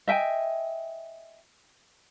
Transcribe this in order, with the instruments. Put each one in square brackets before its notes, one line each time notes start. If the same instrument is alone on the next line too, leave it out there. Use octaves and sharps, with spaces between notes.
[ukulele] D#5 E5 G5 G#5